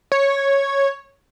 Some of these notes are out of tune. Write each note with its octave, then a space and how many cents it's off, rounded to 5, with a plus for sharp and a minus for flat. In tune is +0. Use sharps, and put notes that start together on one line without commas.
C#5 -5